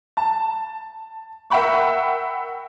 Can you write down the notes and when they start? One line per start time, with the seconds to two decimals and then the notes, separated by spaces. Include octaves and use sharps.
0.17 A5
1.50 A#4 E5 F#5 G5 B5 C#6